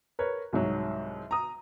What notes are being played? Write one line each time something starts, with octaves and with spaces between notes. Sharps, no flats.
A#4 B4 C#5
C2 G#2 F#3
A#5 D#6